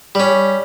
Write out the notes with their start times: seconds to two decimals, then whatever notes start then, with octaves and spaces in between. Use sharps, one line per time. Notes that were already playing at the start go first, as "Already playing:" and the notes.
0.15 G3 C#4